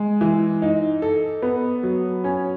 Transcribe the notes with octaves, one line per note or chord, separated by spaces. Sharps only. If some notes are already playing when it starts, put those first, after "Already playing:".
Already playing: G#3
E3
D#4
A4
B3
F#3
C#4